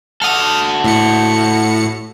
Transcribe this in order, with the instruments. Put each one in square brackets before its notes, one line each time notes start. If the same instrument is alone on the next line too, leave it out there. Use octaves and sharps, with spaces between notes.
[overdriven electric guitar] F#4 A4 [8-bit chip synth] D#6 F6
[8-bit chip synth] A2 C#7